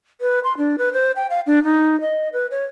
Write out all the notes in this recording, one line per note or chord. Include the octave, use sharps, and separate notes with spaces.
B4
C6
D4
B4
C5
G5
F5
D4
D#4
D#5
B4
C#5